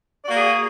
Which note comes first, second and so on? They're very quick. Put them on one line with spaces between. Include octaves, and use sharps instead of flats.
D5 F#4 A#3 G#4